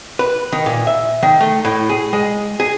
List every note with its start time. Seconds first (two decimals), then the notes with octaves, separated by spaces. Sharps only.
0.19 B4
0.53 D#3
0.66 A#2
0.87 E5
1.23 D#3
1.41 A3
1.65 A2
1.89 G#4
2.13 G#3
2.60 G#4